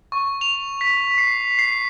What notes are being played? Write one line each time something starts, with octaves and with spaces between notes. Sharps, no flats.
C#6
F7
B6
C7
C7